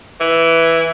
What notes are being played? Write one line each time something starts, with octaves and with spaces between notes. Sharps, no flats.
E3